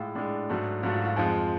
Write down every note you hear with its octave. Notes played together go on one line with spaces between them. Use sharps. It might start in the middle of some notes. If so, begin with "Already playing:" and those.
Already playing: A2 G#3 F4
A2 G#3 D4
G#2 F#3 A3
G#2 F#3 A3 F4
F4
F#4
F4
F2 F3 G#3 F4